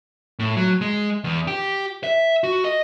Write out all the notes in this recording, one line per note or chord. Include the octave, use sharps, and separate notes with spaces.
A2
F#3
G#3
E2
G4
E5
F#4
D#5